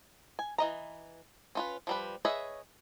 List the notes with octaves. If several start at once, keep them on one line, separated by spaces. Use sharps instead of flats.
G#5
E3 D#5 A#5
C#4 F4 B4
F3 G3 B4
G#4 B4 C#5 D#5 E5